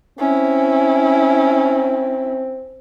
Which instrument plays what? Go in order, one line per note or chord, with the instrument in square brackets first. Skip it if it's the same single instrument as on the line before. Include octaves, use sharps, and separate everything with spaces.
[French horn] C4 [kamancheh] C#4 E4